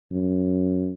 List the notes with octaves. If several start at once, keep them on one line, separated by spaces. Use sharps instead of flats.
F#2